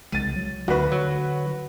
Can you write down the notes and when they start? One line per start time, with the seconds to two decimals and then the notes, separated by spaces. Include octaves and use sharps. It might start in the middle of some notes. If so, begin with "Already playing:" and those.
0.12 C2 C#3 G#3 A6 D#7
0.36 F#3
0.68 D2 D3 F#4 B4
0.92 F#3